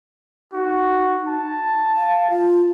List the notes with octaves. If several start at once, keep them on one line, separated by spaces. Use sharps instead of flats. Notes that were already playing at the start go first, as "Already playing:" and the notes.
D#4 F#4
A5
F5
F4